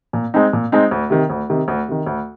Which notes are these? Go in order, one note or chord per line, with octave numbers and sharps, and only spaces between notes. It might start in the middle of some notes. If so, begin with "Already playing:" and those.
A#2
G#3 C4 D#4
A#2
G#3 C4 D#4
D2
C3 D#3
D2
C3 D#3
D2
C3 D#3
D2